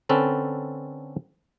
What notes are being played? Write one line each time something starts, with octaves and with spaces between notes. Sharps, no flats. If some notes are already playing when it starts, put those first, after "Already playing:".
D3 C4 C#4 A4 B4